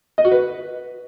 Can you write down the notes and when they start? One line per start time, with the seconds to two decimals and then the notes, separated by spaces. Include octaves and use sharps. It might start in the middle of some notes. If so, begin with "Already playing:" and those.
0.18 D#5
0.25 F#4
0.31 B4